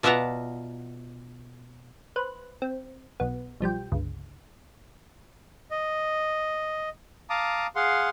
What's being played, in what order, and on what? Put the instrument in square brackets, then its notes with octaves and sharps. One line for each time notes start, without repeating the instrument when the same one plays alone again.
[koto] B2 F4 D5 E5 F#5 A#5
[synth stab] B4 C5 F#6
C4
B1 B3
B1 F3 G3 G5
G1 C#2
[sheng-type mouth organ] D#5
F5 A5 A#5 D6 D#6
G#4 F5 F#5 C6